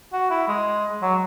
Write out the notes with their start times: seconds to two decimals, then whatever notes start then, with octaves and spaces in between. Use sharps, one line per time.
0.13 F#4
0.30 E4
0.48 G#3
1.02 F#3